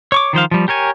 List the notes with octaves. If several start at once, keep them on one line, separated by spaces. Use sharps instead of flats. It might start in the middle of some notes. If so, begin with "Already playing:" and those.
C#5 C#6 D6
D#3 F3 C5 F5
F3 G3
G4 A#4 C#5 G#5